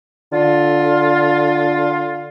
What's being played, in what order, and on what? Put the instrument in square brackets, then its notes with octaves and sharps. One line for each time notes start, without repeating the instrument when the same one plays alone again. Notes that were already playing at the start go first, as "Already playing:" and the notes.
[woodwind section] D3 F4